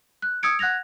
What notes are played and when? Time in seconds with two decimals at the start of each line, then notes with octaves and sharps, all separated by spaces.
0.22 F#6
0.43 D#6 E6 G#6 C#7 D7
0.59 F#5 F#6 G#6 A#6 F7